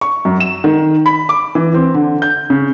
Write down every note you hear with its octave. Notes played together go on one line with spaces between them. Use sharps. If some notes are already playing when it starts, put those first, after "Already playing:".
C#6
F#2
E7
D#3
B5
D6
E3
C4
D3
G6
C#3